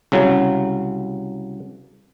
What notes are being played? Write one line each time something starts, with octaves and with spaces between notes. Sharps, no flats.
C2 C#3 F#3